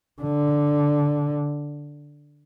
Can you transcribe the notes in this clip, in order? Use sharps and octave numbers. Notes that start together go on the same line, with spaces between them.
D3